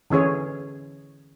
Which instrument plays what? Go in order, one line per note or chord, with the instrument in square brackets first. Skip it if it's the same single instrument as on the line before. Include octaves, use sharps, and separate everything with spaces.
[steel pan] D3 E3 C#4 G#4 C#5